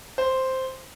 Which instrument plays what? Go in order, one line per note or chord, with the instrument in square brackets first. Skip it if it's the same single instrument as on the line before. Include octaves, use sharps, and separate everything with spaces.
[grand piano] C5